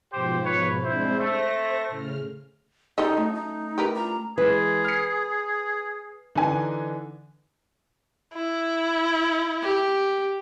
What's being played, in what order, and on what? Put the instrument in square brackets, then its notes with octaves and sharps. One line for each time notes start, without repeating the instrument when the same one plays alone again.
[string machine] G#2 B2 F3 [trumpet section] G4 C5
[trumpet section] B4 C#5
[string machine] G#3 C4 D4 [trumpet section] E4 C5
[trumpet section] A3 [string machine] C5 A#6
[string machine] A2 C#3 F6
[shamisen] G3 A4 D#5 [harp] C#4 A5 [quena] D#4
[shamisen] F#3 [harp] A3
[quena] D#4
[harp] E4 [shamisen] G4 A#4 B4
[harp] D4 F4 [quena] A#5
[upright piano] E3 G#3 [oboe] G#4 [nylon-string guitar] B4
[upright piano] F6 C7
[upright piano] D3 E3 D4 [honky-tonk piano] D#4 G#5
[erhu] E4
[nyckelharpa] G4